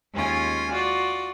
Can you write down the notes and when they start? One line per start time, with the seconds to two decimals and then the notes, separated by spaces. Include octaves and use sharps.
0.14 D#2 G#3 C#4 F4 G#5
0.71 F4 F#4 D5